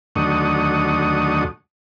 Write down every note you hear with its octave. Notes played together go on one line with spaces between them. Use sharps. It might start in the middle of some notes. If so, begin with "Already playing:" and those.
D#2 D3 F#3 A3 C#6 D#6